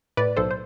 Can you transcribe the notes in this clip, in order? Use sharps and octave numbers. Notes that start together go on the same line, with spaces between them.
A2 B4 D5
B1 A4 C5
C5